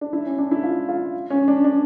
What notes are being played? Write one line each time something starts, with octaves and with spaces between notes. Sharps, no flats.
D4
E4
C#4
D4
E4
F4
F4
C#4
D4
D4